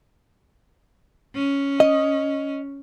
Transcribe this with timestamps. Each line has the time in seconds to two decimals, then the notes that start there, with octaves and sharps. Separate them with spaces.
1.35 C#4
1.80 D#5